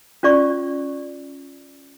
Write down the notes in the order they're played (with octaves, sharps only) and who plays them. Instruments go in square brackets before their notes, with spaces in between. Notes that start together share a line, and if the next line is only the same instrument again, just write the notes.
[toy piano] C#4 F4 D5 C#6